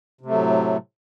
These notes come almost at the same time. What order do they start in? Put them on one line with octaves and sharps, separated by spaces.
C3 A3 F#3 A2